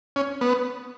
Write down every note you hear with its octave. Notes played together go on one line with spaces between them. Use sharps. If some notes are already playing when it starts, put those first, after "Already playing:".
C#4
B3